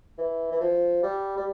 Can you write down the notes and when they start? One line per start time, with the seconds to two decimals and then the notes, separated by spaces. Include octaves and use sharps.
0.18 E3
0.51 E3
0.61 F3
1.03 G3
1.37 G3